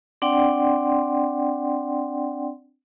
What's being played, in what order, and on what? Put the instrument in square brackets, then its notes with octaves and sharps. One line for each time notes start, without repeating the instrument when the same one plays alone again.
[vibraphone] C4 D4 D5 F#5 G5 C6